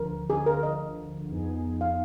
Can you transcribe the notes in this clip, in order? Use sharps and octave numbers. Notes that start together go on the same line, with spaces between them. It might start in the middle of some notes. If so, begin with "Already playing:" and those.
Already playing: D2 D3 F3 A#4
G#4
A#4
D#5
F2 F3 B3 D#4 G#4
F5